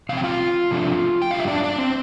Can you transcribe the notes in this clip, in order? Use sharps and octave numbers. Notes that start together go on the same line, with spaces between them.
C3 F3 C4 F5
G5
F4 F5
C3 F3 A3 D4
G5
F2 D3 G3 F5
E5
D4 D5
D4 D5
C4 C5